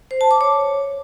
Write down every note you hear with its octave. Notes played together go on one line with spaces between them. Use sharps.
C5
A5
D6
C#5